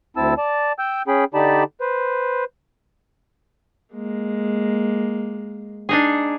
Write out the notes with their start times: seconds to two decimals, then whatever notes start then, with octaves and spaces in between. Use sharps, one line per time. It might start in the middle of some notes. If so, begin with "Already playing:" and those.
0.17 D2 C4 E4 A5 E6
0.38 D5 A5
0.79 G5 E6 G6
1.08 C#4 G#4 G5 B5
1.34 D3 D#4 G4 D5 A5 B5
1.81 B4 C5
3.94 G#3 A#3
5.89 D4 D#4 G#4